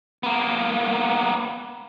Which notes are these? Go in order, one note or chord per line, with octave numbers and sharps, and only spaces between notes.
A#3 B3